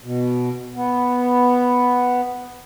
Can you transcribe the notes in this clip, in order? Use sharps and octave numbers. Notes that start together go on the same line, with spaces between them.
B2
B3